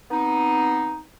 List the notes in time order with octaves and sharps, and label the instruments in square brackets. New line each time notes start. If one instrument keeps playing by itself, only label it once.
[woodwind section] B3 C4 D#4